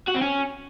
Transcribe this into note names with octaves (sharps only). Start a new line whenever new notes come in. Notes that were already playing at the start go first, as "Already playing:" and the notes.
F#4
C4
C#4